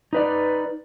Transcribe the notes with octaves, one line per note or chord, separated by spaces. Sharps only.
D#4 B4 D5